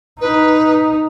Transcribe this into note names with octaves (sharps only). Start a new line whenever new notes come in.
D#4 B4